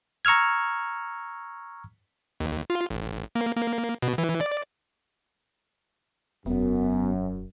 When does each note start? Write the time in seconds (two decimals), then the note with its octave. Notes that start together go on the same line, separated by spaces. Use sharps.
0.25 A#5 C#6 E6 F6 G#6
2.40 D#2
2.70 F4
2.90 A1
3.35 A#3
3.56 A#3
4.02 B2
4.18 E3
4.41 D5
6.46 E1 F#2 B3